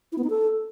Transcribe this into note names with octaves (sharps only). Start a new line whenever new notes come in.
E4
B3
D#4
A4